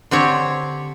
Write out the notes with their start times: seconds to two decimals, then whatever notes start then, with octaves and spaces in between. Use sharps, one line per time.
0.11 D3 C4 G4 C#5